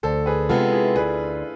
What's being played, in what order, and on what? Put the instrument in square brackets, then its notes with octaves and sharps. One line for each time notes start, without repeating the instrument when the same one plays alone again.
[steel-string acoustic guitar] D2 [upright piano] A4 C5
[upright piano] G#4 B4
[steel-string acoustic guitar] C3 G#3 B3 [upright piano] F4 A4
[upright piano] E4 G#4
[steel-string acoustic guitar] D2 [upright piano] G#4 B4